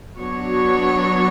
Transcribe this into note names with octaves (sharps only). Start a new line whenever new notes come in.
F#3 B3 D4 F#4 C#5